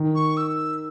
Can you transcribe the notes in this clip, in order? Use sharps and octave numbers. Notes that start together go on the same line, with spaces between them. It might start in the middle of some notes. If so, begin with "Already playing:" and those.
Already playing: D#3
C#6
E6